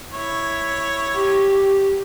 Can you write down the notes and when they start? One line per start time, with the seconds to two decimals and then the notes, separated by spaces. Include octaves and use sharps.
0.12 E4 C#5
1.14 G4